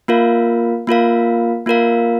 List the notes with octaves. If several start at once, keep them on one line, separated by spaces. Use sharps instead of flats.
A#3 F4 A#4 F5
A#3 F4 A#4 F5
A#3 F4 A#4 F5